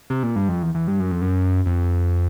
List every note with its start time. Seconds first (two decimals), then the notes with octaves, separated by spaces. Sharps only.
0.10 C3
0.23 A#2
0.36 G2
0.49 F2
0.63 E2
0.75 E2
0.88 G2
1.00 F#2
1.11 F2
1.22 F#2
1.66 F2